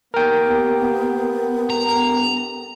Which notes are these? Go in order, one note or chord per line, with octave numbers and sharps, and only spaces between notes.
A#3 B3 G4 A#4 G5
G2 G4 A4 A#5